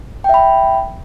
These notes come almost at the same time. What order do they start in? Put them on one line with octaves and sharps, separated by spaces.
G5 E5 B5